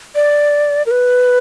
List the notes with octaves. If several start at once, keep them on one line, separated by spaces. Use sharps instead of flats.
D5
A#4
B4